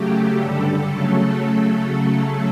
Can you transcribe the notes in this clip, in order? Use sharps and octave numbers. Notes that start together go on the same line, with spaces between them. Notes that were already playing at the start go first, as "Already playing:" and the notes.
Already playing: C#3 F#3 A3 G4
G2 D3 G3 A4
C#3 F#3 A3 A4